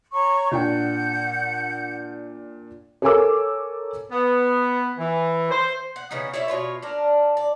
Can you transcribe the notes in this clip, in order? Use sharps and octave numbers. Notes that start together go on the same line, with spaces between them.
C#5 A#5 C#6
A#2 D4 F#5 G5 G6
A4 A#4 C#5 G#5 D6 E6
B3
E3
C5
F#5
C#3 E3 B3 D#4
E4 C#5 D5 E5
B2 F4 C#5
D4 A#4
D5